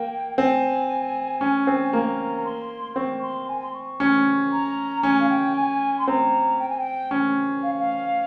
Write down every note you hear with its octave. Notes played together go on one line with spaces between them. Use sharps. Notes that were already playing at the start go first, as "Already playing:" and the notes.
Already playing: A#3 G5
C4 G#5
C#4
C4
A#3 A#5
A#5
C6
C4 C#6
C6
G#5
C6
C#6
C#4
A#5
C#4 G#5
F5
G5
G#5
C6
C4 A#5
G5
G#5
G5
C#4
F5
F5